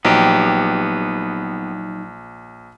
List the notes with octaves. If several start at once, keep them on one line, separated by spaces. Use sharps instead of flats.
A#1 F#3 B3 D#4 G4